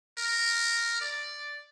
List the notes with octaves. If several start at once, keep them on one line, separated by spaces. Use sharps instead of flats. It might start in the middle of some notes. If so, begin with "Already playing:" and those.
A#4
D5